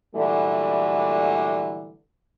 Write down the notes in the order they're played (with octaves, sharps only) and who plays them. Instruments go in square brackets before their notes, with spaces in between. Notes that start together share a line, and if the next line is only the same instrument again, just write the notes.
[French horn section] A#2 D3 E3 F#3 G3 A3